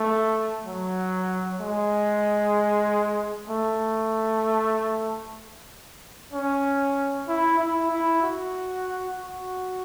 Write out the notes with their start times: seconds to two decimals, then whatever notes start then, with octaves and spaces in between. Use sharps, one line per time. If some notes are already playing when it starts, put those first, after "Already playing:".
Already playing: A3
0.65 F#3
1.60 G#3
3.49 A3
6.33 C#4
7.28 E4
7.59 E4
7.91 E4
8.23 F#4
9.17 F#4